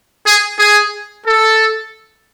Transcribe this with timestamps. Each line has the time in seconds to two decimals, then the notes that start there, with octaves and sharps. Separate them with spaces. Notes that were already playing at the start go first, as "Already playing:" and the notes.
0.26 G#4
0.59 G#4
1.26 A4